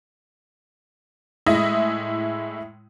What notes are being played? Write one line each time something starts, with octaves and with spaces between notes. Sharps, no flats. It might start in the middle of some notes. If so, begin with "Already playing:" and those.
A2 G#3 E4 E5 D#6 A#6